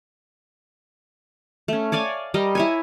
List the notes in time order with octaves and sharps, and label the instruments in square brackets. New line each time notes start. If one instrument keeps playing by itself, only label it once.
[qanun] A3 C#4
C#5 D5 F5 G#5
G3 A#4 D#5
E4 C#5 G#5